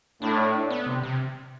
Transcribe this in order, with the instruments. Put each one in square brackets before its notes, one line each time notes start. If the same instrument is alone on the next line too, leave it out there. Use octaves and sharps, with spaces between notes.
[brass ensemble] A2 [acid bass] D4
[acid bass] E4
D4
B3
C3
C3